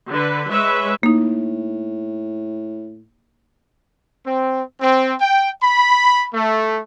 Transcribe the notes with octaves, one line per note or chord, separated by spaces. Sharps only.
D3 B4
G#3 B4 C#5 E5
A2 A#3 D#4
C4
C4
G5
B5
A3